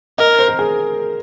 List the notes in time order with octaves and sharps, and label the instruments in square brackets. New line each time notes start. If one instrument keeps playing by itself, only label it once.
[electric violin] A#4 [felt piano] D#5
[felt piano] C5
A#4
G#4